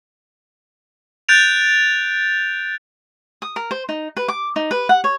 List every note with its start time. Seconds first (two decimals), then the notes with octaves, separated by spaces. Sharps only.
1.29 F#6 G6 A6 D7 F7
3.42 D#6
3.56 A#4
3.71 C5
3.89 D#4
4.17 B4
4.28 D6
4.56 D#4
4.71 B4
4.89 F#5
5.04 C#5